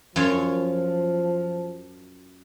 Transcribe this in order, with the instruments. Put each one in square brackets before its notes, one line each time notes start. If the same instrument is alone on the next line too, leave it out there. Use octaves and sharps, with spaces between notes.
[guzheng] F#2 F4 C#5 [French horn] F3